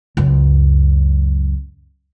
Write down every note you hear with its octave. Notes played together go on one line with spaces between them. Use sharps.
C#2 F#2